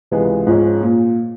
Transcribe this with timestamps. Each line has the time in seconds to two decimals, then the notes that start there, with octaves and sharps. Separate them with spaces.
0.11 C#2 C3 E3 G#3 B3
0.47 G#2 F3 G#3 C#4
0.81 A#2